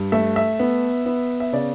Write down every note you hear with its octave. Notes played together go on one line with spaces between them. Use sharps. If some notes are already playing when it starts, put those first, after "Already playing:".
Already playing: G2
A3 E5
E5
B3
B3
E5
C#3 D5